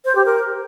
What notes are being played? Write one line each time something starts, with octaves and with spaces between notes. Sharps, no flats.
C5
G4
A#4